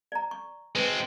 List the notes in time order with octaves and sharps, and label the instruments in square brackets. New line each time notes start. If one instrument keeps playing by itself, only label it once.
[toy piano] D5 A#5
C#6
[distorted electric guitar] G#3 C4 [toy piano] B4